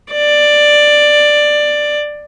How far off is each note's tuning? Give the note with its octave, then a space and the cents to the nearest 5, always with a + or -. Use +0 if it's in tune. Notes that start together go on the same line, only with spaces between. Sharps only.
D5 +10